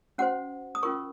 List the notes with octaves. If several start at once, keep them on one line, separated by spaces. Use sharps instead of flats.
C#4 F#4 C5 F#5
D#6
C#4 F4 A#4 C#6